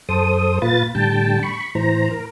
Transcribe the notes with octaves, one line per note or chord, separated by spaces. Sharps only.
F#2 A4 C5 D#6
A#2 F4 B4 A6
A2 D3 G3 G5 A5
B5 C#6
A2 E3 C5 A#5
A#4